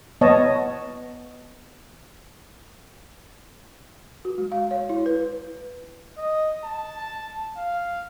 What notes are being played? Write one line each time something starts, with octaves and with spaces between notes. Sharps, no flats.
B3 C#5 D#5 A5
F#4
G#3
F5
C#5
E4
B4
D#5
A5
F5